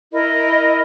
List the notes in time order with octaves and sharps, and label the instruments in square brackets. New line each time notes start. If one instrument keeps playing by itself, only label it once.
[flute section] E4 A#4 D#5